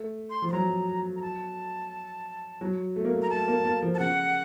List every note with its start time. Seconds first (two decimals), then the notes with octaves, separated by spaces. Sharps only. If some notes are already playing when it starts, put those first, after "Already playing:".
Already playing: A3
0.30 C6
0.42 F3
0.49 C6
0.52 F#3 A#5
1.16 A#5
1.22 A5
2.61 F#3
2.96 A3
3.05 A#3
3.14 A3
3.22 A#5
3.30 A3 A5
3.48 A#3
3.65 A#3
3.82 F3
3.94 A5
3.99 C#3 F#5